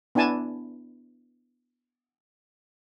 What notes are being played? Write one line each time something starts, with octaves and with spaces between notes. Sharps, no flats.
B3 D4 E4 G#5 A5